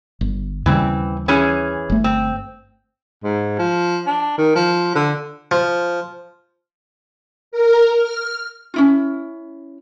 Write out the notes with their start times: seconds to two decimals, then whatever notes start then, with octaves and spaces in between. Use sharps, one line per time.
0.21 G1
0.66 D#2 C#3 E3 G3 C4
1.28 E3 C#4 G#4
1.90 G1 A3
2.04 C4
3.24 G#2
3.59 F3
4.07 D4
4.38 D#3
4.56 F3
4.95 D3
5.51 F3
7.52 A#4
7.95 F6
8.74 C#4 E4 F4